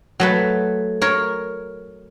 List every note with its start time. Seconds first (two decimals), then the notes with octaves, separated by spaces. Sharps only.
0.20 F#3 A3 B4
1.02 A#4 C#5